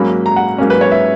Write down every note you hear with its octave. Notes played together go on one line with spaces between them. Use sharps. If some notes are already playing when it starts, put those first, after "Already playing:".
Already playing: G#2 F#3 A#3 C#4 B5
A#5
F#5
G#2 F#3 A#3 C#4
B4
C#5
E5